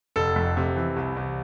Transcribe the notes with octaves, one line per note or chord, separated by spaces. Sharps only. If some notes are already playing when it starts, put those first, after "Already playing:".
F1 A4
F2
C3
E3
C2
C2